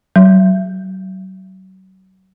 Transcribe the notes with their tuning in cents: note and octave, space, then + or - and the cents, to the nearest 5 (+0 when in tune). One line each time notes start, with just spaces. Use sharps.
F#3 +35